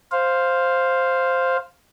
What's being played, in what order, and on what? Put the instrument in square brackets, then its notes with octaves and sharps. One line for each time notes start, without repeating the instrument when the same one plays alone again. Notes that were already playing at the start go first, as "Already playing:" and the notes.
[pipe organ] C5 F5